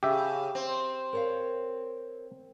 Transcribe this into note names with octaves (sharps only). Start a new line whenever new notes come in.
C#3 G4 E5
C4
A#4 C#5 F5